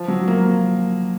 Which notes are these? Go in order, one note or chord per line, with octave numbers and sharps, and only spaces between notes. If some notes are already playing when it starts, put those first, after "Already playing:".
Already playing: F3
F#3
A#3